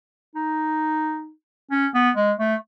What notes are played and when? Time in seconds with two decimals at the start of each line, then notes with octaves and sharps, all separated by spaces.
0.35 D#4
1.71 C#4
1.94 B3
2.16 G#3
2.39 A3